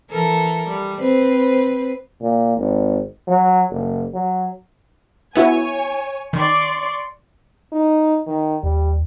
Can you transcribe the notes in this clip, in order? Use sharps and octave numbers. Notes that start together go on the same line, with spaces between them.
E3 A4 A#4
G3
C4 B4 C5
A#2
G#1
F#3
F#1
F#3
B3 E4 F#4 C#5 G#5
D#3 D5 C6 C#6
D#4
D#3
D#2 G3